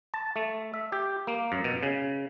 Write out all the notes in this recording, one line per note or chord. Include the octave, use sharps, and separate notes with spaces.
A5
A3
E5
G4
A#3
F#2
B2
C#3